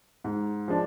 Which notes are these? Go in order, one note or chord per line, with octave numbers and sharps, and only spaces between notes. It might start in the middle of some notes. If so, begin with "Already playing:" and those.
G#2
F3 G#3 D4